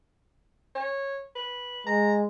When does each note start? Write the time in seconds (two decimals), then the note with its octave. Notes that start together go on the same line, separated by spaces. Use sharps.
0.76 C#5
1.35 B4
1.87 G#3 A#5